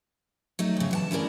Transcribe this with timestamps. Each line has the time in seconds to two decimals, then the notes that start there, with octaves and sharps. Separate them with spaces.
0.59 F#3 A3 D#4
0.77 F2 C#3
0.91 E3 F#5 A5
1.11 D2 C#4 E4 A#4 D5